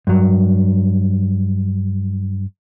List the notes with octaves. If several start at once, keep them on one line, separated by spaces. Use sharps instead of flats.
G2 F#3